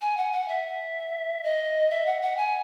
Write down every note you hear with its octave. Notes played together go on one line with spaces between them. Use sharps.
G#5
F#5
F#5
E5
D#5
E5
F#5
F#5
G#5